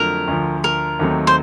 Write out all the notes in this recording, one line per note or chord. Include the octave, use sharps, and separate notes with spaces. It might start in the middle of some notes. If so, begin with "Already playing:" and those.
Already playing: F2 D3 F#3 A3 A#4
D2 D3 F3
A#4
D#2 D#3 F#3 A3 C4
C5